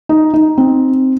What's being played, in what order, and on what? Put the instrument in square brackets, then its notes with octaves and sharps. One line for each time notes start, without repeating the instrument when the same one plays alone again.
[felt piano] D#4
D#4
C4